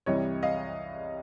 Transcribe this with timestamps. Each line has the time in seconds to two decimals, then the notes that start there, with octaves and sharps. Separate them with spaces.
0.06 C2 C3 E3 G3 C#5 D#5
0.43 D#5 F5